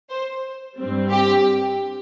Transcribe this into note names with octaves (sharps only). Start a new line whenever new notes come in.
C5
G2 G3 C4
G4